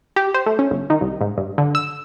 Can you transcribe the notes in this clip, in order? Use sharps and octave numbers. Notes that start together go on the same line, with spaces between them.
G4
C5
A3
C#4
G1
D#3
C2
G#2
G2
D3
E6